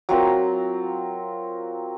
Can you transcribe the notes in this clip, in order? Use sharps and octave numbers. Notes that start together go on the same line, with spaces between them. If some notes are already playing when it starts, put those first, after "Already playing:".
F#3 C4 F4 A#4